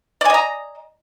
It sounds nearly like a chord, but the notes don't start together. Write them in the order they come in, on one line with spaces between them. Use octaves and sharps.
D5 G#5 D#5 A#5